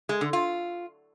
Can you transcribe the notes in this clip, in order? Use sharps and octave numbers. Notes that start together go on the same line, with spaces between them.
G#3
D3
F4